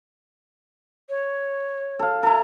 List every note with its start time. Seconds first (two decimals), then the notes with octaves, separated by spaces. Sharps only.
1.09 C#5
1.99 A4 F5
2.23 E4 A4 A#5